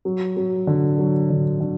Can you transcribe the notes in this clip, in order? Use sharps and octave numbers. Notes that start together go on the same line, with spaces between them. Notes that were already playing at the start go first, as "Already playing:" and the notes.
F#3
F#3
D3
F#3
D3
D3